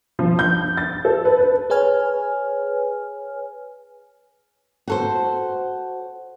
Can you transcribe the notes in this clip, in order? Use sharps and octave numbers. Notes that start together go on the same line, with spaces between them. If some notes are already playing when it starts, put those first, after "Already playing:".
F3
G6
A6
A4
B4
B4
G#4 B4 C#5 G#5 F6
F#4 A4 C5